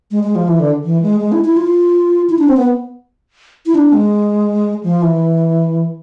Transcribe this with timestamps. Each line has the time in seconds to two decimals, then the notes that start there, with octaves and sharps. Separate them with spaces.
0.11 G#3
0.23 G#3
0.35 F3
0.48 E3
0.60 D3
0.84 E3
1.02 G#3
1.20 G#3
1.32 E4
1.44 E4
1.57 F4
2.30 E4
2.39 D4
2.48 C4
2.57 B3
3.66 E4
3.75 D4
3.93 G#3
4.83 F3
5.02 E3